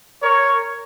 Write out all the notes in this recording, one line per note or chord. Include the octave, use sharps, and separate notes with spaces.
A#4 C#5